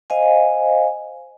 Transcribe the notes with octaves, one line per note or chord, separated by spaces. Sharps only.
C5 D#5 F5 G#5